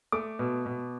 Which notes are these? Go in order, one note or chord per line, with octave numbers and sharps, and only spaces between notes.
A3 D6
B2
B2